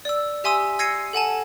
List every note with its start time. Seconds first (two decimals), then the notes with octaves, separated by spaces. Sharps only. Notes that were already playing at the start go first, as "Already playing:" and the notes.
0.05 D5 E6
0.44 G4 E5 G#5 C6 D#6 E6
0.79 E6 G#6 A#6 C7 C#7 D#7
1.13 A4 F#5 G#5 A5